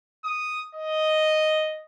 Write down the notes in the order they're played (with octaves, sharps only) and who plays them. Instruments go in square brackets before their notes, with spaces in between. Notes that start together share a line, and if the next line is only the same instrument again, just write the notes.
[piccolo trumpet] D#6
D#5